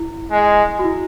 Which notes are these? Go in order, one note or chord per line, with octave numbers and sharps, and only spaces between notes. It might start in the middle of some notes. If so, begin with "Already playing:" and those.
Already playing: E4
G#3
F#4
E4